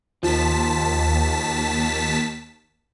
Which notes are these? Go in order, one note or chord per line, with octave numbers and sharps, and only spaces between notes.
D#2 F3 A5 B6